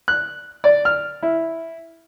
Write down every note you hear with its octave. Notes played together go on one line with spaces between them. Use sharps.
F#6
D5
F6
E4